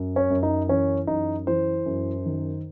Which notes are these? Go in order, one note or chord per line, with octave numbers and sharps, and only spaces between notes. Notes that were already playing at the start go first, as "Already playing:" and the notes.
Already playing: F#2
C#4
F#2
D#4
E3 C#4
F#2 D#4
E3 C5
F#2
D#3